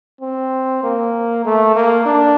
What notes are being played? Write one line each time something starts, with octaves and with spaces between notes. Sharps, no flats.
C4
A#3
A3
A#3
D4